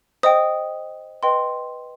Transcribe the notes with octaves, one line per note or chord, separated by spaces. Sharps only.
C5 D#5 G5 D#6
B4 D#5 G5 C6